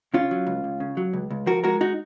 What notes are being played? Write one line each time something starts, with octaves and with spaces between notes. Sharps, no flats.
C#3 C#4 F4
F#3
C#2
C#2
C#3
F#3
C#2
C#2
F3 F#4 A#4
G#3 F#4 A#4
D#4 F#4